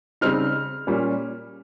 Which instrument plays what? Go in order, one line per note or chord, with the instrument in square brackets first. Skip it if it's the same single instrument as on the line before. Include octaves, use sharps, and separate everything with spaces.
[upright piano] C#3 G3 C4 D#4 F6
A#2 G3 C#4